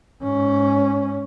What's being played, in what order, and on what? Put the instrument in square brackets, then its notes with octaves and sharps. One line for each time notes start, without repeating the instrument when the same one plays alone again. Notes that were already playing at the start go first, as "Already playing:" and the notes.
[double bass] G#2 C#4